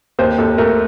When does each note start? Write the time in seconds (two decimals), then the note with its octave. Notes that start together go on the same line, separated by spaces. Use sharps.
0.19 D#2 C5
0.38 D#2 A4
0.58 A3 A#4